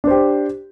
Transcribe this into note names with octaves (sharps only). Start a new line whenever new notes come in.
D4 G4 C5